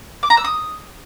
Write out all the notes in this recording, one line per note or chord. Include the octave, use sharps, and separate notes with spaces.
D6
A#5
E6
D#6